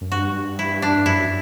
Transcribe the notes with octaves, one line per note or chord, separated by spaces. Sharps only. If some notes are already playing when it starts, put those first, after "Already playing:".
F#2
G2 F#4
E4
D4
G2
F#2 E4